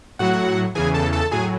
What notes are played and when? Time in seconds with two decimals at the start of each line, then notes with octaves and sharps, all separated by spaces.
0.19 A2 F#3 F#4 F#5
0.75 E2 C#3 E3 G#4 G#5
0.94 A4 A5
1.13 A4 A5
1.31 A2 F#3 G#4 G#5